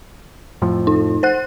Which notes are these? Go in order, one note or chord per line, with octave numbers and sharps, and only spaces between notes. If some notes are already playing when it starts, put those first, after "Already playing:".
F2 A2 F3
D#4
C5 F#5 F#6